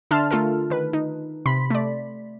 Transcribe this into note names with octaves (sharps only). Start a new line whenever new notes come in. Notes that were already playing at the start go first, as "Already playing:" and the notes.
D3 D4 E5 A5 C6 F6
A3 F4 A4 A#4
D#3 B4
D#4
C3 B5 C6 B6
A3 D5